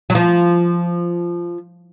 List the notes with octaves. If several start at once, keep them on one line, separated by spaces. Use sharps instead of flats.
F#3
F3